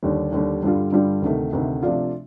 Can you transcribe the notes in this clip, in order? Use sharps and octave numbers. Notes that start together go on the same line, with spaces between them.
D#2 D3 G3
D#2 D3 G3
G2 D3 G3 D4 F4
G2 D3 G3 D4 F4
D2 C3 D#3 A3
D2 C3 D#3 A3
C3 F3 A3 D4 F4